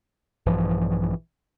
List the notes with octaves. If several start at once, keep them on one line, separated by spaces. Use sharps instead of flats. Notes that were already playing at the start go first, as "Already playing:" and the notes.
A#1 G2 E3 F3